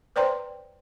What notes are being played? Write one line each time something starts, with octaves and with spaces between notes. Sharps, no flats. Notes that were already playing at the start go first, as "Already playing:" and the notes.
B4 C5 D5 G5 A#5 C6